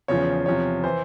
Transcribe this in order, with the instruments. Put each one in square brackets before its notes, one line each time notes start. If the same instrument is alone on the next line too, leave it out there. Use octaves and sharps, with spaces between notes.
[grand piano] E2 C#3 F3 C#5
E2 C3 F3 C#5
E3 C5